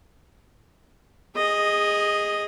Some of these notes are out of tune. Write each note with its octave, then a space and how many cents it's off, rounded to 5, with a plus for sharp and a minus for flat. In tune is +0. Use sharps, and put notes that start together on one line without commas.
G#4 -20 D#5 +0